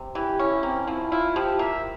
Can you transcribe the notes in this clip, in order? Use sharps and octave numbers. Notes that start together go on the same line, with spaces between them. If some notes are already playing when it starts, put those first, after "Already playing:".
Already playing: C3
E3 G4
C#4 E4
A#3 C4
F3 E4
E4 F4
F3 G4
A#3 E5